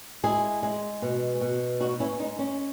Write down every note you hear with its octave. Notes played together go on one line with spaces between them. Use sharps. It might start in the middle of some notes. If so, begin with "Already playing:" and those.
G#3 E4 G#4
G#3
B2
B2
B3 D#4 F#4
C#4 E4
G#3 D#4
C#4